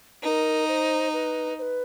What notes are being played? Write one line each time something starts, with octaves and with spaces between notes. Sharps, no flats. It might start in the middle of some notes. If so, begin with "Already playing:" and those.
D#4 A#4 B4
C5
B4
C5
B4